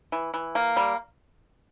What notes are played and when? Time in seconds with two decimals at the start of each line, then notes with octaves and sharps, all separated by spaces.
0.12 E3
0.34 E3
0.55 A#3
0.76 G3